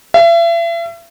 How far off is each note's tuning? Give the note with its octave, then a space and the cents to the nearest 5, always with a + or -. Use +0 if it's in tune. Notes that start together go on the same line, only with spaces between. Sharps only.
E5 +40